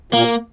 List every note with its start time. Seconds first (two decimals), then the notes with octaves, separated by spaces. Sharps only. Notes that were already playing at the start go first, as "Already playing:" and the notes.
0.12 A#2 A#3